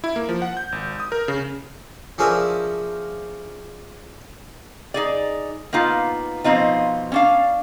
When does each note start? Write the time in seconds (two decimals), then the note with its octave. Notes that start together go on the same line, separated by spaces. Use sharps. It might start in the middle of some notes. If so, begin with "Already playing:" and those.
0.04 E4
0.16 A#3
0.29 F3
0.42 F#5
0.57 G6
0.72 G#1
1.00 D#6
1.12 A#4
1.28 C#3
2.18 F3 C#4 D4 G#4 A#4 E5
4.94 D#4 G#4 D5
5.73 A#3 B3 D#4 F4
6.44 B2 F3 C4 D#4 F4
7.12 C#4 D4 F5